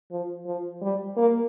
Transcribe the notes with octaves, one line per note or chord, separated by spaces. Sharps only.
F3
F3
G3
A#3